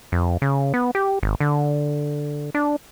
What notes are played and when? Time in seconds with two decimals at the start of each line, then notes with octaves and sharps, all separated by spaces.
0.12 F2
0.42 C#3
0.74 B3
0.95 G4
1.23 G#1
1.40 D3
2.55 D4